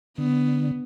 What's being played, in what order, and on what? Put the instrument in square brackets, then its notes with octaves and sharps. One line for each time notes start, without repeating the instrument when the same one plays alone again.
[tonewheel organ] D3 [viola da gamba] B3